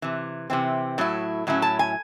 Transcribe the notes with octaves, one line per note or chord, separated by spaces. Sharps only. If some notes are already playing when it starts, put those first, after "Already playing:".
C3 E3
C3 E3 C4
A2 F#3 E4
A2 F#3 C#4 E4
A5
G#5